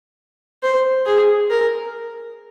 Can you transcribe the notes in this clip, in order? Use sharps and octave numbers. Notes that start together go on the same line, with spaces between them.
C5
G#4
A#4